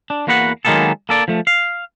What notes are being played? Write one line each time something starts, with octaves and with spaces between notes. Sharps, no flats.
D4
E2 A#3 F#4 B4 F5 F#5
D#3 F#3 G#3 A#3 B3 A4
A#3 A4 D5
F3 A3
F5